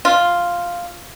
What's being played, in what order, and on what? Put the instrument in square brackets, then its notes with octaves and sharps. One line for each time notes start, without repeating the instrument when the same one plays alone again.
[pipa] F4